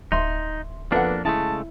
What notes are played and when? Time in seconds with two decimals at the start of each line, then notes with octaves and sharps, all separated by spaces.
0.12 D1 D#4 E5 C6
0.92 F2 A#3 B3 D4 A4 F#5
1.25 C#3 G#3 A3 E4 A5